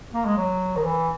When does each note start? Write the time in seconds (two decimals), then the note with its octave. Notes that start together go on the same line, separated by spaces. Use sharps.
0.14 A#3
0.25 G#3
0.37 F#3
0.76 D#3
0.84 E3